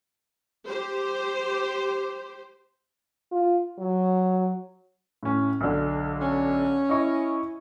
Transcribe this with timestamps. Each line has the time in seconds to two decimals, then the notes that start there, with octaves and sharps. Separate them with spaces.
0.68 G4 C5
3.32 F4
3.79 F#3
5.23 A2 C#4
5.61 B1 D3
6.21 C#4
6.89 E4 D#5 C#6